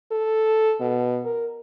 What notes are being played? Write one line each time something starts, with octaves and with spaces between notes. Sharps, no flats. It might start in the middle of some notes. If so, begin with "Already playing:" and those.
A4
B2
A#4